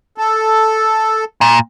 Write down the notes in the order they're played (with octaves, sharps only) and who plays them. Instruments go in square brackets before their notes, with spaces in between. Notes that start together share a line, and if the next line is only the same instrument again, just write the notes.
[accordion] A4
[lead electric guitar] A#2